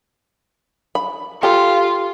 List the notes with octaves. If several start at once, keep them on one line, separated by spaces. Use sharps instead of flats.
B5
F4 G4 A4 A#5